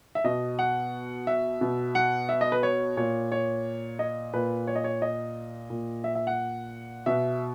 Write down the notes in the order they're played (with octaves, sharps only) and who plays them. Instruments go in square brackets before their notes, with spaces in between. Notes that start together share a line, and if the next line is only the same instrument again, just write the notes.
[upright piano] E5
B2 D#5
F#5
E5
B2
F#5
E5
D#5
B4
C#5
A#2 C#5
C#5
D#5
A#2 B4
C#5
D#5
C#5
D#5
A#2
E5
E5
F#5
B2 E5